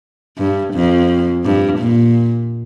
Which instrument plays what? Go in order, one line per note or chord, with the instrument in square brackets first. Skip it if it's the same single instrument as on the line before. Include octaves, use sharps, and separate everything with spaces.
[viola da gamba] G2
F2
G2
A#2